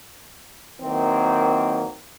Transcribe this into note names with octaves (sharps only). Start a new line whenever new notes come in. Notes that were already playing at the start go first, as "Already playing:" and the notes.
D#3 E3 F#3 A#3 C4